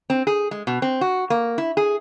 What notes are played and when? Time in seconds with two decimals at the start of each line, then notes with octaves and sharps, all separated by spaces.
0.10 C4
0.27 G#4
0.51 G#3
0.67 B2
0.82 C4
1.01 F#4
1.30 A#3
1.58 E4
1.77 G#4